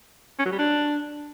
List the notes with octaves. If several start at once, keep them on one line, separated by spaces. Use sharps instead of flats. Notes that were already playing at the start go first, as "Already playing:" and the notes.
C#4
F#3
G3
D4